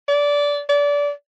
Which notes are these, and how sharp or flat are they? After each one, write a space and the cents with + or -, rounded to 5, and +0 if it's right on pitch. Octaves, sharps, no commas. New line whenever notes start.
D5 -20
D5 -25